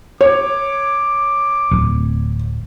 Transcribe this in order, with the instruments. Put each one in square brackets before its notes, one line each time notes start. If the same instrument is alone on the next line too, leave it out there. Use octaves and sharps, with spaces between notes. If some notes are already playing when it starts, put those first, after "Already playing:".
[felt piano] C#5 [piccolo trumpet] D6
[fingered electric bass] D1